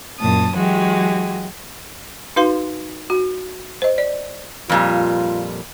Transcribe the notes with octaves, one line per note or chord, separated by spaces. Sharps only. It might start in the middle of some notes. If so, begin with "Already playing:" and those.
F#2 A#2 A5 D#6
E3 F#3 G#3 F#4 G4
D#4 F#4 B4 F5 C6
F#4
C5 D#5
D5
F2 A#2 G3 F4